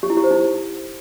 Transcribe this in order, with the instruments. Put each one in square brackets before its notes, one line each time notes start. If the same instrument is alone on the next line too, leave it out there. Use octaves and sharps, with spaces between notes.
[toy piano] G4
E4
G4
C5
D#4